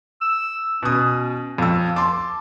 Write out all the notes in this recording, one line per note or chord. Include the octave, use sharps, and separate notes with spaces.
E6
B2 C#4 D#6
F2 F5 E6
A5 C6 D6